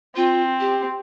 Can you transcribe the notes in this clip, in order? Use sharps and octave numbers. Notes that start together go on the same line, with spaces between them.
C4 F4
G4